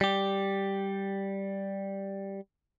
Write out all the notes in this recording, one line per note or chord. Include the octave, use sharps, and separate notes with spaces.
G3 G4